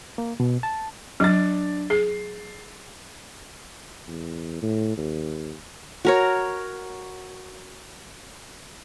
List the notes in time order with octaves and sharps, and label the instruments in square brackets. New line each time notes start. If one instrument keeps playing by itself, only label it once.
[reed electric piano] A#3
B2
A5
[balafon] F#3 [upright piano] D4 A6
[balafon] G#4 [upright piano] C7
[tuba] E2
A2
D#2
[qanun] F#4 A#4 C#5